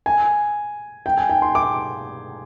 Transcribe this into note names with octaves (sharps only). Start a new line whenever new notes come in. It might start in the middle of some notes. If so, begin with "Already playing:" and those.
G#5
G5
G#5
G5
C6
D6